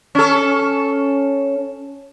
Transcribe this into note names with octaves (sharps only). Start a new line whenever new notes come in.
C#4 A4